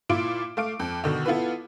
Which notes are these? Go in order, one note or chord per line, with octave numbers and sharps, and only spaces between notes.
A#2 E4 F4 D6 D7
A3 F5 D7
F2
B2 D3 D#3
B3 E4 F4 A4 B4